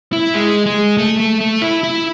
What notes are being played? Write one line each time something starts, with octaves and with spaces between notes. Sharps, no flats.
E4
G#3
G#3
A3
A3
A3
E4
E4